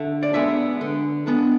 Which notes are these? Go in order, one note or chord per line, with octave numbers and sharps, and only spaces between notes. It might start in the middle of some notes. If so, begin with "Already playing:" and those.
Already playing: D3 E5
D5
G#3 B3 D4 E5
D3
G#3 B3 D4